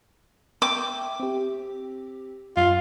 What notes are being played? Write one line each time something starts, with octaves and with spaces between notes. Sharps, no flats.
E5 G5 D6
C4 G4
F#2 F4